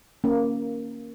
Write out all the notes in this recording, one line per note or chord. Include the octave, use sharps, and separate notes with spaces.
A#3 C#4 A#4